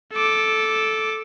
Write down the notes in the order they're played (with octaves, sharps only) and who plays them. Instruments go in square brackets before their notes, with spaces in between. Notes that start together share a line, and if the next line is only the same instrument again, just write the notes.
[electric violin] A4 D6